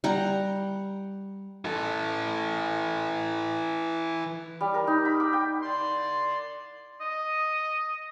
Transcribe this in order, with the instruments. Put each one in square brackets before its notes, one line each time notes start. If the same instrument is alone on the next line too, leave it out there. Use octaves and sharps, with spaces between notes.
[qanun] G3 F#5 A#5
[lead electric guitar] E3 A4
[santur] G3
A#4
D#4
B5
D6
G5
[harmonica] D5 C6
[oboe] D#5